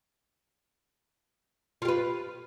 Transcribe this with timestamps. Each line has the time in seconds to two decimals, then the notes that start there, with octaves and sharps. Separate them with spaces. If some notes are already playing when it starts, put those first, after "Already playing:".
1.82 F4
1.85 G4
1.88 B4